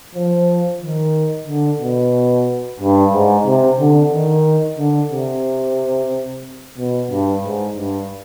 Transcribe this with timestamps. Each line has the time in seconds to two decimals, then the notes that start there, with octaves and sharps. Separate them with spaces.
0.15 F3
0.82 D#3
1.47 D3
1.81 B2
2.80 G2
3.13 G#2
3.46 C3
3.80 D3
4.12 D#3
4.79 D3
5.12 C3
6.78 B2
7.11 G2
7.44 G#2
7.77 G2